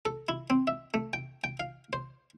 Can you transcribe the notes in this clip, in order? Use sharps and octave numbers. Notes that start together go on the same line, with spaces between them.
A4
E4
C4
E5
A3
G5
G5
F5
C5